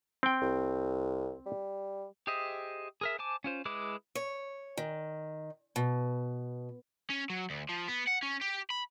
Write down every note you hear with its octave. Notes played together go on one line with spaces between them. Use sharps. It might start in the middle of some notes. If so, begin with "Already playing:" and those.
C4 G5
C2
G3
G4 G#4 C5 D#5 E5
G#4 A#4 E5
C5 G#5 A5 D6
C#4 F4 C5
G#3 E4 G#4 B4 D6
C#5
D#3
B2
C#4
F#3
D2
F3
B3
F#5
C#4
G4
B5